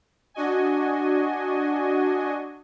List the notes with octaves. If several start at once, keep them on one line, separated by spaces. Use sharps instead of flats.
D4 F#4 D#5 G#5